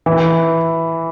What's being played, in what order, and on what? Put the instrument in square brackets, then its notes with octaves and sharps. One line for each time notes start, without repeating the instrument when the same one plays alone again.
[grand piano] E3